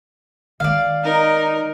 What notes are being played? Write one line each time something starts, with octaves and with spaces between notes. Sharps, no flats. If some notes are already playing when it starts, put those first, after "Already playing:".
D#3 G#3 D5 F5
D#4 A#4